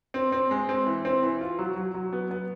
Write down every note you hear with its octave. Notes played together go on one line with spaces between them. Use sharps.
C4
C4
G#3
C4
E3
C4
E3
F4
F#3
F#3
F#3
B3
B3